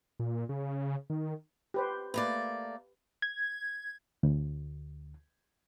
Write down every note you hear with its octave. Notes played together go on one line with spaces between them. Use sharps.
A#2
C#3
D#3
G4 B4 C5
A3 A#3 B4 D5
G#6
D2